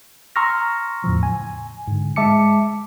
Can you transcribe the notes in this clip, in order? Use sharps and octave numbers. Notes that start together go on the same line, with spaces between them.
A#5 C6 C#6 E6 F6 A#6
E2 A2 C#3 F3
G#5
G#2 D3
G#3 E5 A5 D6 C#7